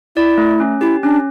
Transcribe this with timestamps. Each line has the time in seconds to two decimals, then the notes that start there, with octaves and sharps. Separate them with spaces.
0.16 E4 D5
0.38 A3
0.60 C#4
0.81 E4 G4
1.03 C#4 D4